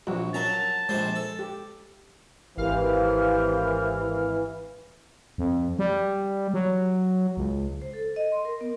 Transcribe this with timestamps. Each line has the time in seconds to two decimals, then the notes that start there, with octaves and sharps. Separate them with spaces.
0.07 A#1 F3 G3 F#4
0.34 F#3 C#4 A#4 A5 A#5
0.89 A#1 G3 G#3 C5
1.15 A4
1.39 G4
2.57 G#1 E3 G4 A#4 C5 F5 F6
5.38 F2
5.79 G3
6.54 F#3
7.37 C#2
7.82 C5
7.94 A4
8.16 D#5
8.32 C6
8.45 A#4
8.61 B3